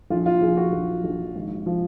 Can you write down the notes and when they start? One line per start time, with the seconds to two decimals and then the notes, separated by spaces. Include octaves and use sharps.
0.10 A#1 F4
0.26 F4
0.42 A#1 G#4
0.57 F#4
0.73 A#1
1.04 A#1
1.35 G#1
1.66 F3